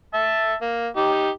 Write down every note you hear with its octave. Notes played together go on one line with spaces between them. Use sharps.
E5 A5
A#3
D#4 G4